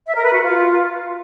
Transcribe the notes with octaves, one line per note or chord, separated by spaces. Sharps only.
E5
A#4
B4
F#4
F4